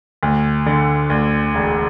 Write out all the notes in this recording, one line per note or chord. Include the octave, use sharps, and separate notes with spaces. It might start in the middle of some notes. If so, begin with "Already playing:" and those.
D2
D3
D2
E1